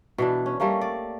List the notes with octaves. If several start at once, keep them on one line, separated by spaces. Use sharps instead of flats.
B2 E3 D4
C#4
G3 A3 A#3 C#4
D5